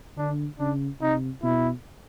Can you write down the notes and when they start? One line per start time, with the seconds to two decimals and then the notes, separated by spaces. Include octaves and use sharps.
0.17 D3 D4
0.59 C#3 D4
1.01 C3 D#4
1.43 B2 E4